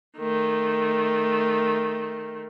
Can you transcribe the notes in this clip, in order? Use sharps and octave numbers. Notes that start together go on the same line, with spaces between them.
D#3 A3